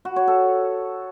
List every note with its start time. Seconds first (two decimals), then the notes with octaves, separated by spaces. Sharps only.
0.05 F#4
0.16 C#5
0.27 A4